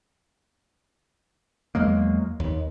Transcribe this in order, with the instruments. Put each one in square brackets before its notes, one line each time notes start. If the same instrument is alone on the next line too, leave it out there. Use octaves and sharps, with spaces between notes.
[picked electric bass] E2 F#3 G#3 A#3
D#2